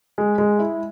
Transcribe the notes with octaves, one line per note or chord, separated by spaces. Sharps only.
G#3
G#3
E4